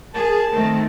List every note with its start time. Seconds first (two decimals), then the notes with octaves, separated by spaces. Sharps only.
0.14 G#4 A#4 A5
0.51 D#3 A3 C4